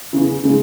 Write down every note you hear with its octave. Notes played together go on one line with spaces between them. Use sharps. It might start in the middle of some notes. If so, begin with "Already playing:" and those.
E2 C#3 E3
C#3 G#3 D#4